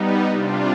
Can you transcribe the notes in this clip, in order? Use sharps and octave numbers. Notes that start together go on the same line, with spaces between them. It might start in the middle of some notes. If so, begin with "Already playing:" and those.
Already playing: G3 B3 D#4
C3 G3 D4 F4